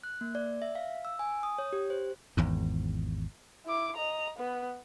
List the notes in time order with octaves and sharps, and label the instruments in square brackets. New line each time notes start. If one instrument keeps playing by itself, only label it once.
[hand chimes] F#6
A#3
D5
E5
F5
E6
G#5
D#6
C#5
G4
C5
[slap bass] G#1 E2 G#2
[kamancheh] E4 D6
D#5 A#5
B3 B4